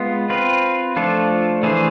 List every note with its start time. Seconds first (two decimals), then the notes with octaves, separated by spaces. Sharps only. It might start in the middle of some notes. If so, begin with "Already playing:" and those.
Already playing: G#3 B3 F4
0.29 C4 F4 B4
0.96 F3 A3 D4 F4 A4
1.63 E3 A3 D4 G#4 C5